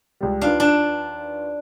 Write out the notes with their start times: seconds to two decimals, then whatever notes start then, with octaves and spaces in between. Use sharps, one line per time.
0.21 C#2 G3
0.41 D#2 D4 F4 B4 F5
0.60 D4 A5